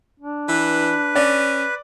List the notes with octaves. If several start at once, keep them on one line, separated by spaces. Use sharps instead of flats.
D4
E3 B4
C#4 D5